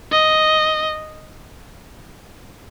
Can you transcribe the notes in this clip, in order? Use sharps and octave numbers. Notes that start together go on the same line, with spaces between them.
D#5